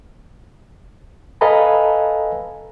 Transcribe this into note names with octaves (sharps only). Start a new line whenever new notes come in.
A4 B4 D#5 F5 G#5 A#5